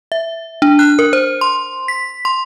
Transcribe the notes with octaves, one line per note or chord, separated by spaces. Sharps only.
E5
D4
F#6
A#4
C5
C6
B6
C6